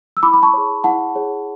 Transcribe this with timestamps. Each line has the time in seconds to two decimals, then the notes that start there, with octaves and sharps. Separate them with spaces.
0.17 E6
0.22 E4 B5 D6
0.34 B5
0.43 A5 C#6
0.53 G#4 C#5
0.84 E4 F#5 A5
1.15 G#4 C#5